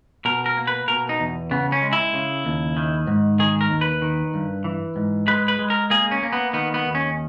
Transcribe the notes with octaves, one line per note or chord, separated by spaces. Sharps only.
B2 A#4
A#4
A#3
B4
B2 A#4
D#4
E2
C#3 B3
C#4
G#3
E4
C#3
D#2
D#3
G#2
D#3 G#4
A#4
D#2
B4
D#3
G2
E3
G#2
G#3 B4
B4
G#3
A#4
A#3 G#4
C#4
A#3
B3
D#3 B3
B3
D#2
C#4